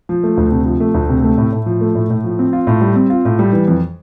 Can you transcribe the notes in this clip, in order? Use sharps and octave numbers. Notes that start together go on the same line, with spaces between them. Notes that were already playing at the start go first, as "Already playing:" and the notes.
F3
A3
D2
C3
F3
A3
D2
C3
A3
A2
A2
F3
A3
A2
A2
F3
C4
F4
A2
G3
C4
F4
A2
G3
E3
F2